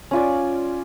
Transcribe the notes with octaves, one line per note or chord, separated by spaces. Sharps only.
C#4 F4 D5